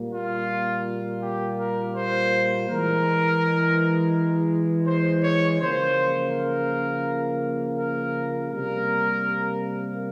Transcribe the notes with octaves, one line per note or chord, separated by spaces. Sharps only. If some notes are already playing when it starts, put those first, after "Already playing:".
Already playing: A#2 G3 A#3
F4
G4
A#4
C5
E3 G#3 A#4
C5
C#5
C#3 F3 A#3 C5
A#4
A#4
C3 G3 A#3 A#4